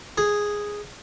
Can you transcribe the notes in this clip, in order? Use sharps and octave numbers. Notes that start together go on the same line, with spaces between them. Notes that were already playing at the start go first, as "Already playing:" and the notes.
G#4